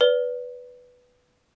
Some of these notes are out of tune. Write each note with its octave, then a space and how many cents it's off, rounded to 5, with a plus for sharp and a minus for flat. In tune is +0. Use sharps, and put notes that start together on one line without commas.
B4 +0 D5 -20